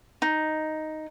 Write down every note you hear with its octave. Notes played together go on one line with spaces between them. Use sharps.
D#4